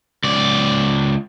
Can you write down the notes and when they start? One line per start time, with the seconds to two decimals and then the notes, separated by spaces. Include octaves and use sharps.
0.24 C#2 D5